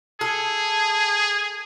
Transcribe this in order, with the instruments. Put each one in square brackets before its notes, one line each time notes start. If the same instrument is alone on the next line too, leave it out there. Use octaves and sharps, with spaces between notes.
[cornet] G#4 [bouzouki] A4